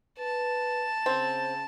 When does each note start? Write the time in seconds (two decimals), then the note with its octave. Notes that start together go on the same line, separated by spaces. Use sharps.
0.19 B4 A5
1.06 C#3 C4